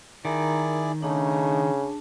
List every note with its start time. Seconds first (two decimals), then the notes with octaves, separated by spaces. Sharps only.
0.25 D#3 E4 G#4 A#4 D5 A#5
1.02 C#3 A3 D4 D#4 G#4 A5